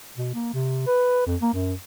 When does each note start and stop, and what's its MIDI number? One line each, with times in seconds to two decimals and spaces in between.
0.17 0.30 47
0.34 0.50 58
0.54 0.84 48
0.87 1.26 71
1.27 1.36 41
1.42 1.52 58
1.54 1.74 42